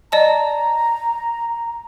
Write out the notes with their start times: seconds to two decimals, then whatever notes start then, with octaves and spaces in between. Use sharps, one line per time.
0.12 D5 D#5 A5 A#5